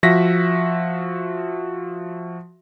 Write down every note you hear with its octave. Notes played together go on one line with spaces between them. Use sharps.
F3 F#4 E5 A#6 B6